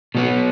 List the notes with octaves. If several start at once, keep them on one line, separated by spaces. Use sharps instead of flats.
B2 F#3 B3